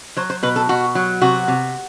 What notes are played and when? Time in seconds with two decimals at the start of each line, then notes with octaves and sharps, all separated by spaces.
0.17 F#3 C5
0.30 C5
0.43 B2 B4
0.56 A4
0.69 B2 F#4
0.95 F#3
1.21 C3 F#4
1.48 C3